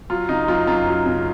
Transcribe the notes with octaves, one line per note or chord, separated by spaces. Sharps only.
F#3 F4
C#3 D#4
F#2 F4
F#2 F4
F#3
C#3